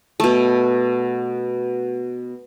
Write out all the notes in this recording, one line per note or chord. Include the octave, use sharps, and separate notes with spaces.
B2 A3